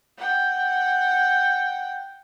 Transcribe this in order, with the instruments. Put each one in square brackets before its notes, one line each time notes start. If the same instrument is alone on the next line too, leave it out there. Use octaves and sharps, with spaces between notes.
[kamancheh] F#5 G5